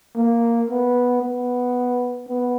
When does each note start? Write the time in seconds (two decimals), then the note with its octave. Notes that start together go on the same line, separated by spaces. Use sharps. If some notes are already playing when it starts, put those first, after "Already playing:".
0.16 A#3
0.70 B3
1.22 B3
2.29 B3